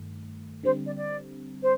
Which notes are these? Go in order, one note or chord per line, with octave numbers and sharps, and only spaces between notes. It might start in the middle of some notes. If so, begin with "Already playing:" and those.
Already playing: G2 D#3 A3
D3 G3 C4 C5
D5
D5
C5